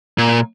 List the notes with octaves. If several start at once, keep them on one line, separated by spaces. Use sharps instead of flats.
A#2